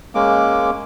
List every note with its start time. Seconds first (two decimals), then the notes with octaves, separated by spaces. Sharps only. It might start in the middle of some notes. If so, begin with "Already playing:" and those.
0.15 G#3 A#3 C#4 D6